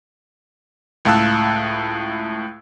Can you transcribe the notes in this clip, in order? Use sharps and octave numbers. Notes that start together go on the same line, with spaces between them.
C#2 A2 F5 A5 E6 F#6